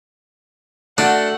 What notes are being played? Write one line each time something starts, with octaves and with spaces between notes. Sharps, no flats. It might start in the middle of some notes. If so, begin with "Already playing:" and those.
A3 D4 F#4 A4 F#5